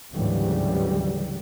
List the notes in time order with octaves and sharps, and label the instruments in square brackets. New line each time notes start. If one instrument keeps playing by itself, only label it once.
[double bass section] D2 G#2 C#3 E3 F#3 G3